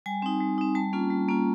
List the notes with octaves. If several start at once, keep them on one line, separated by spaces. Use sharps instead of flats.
G3 G#5
C4 D#4
G3
C4 D#4
G3 A5
A#3 C#4 F4
G3
A#3 C#4 F4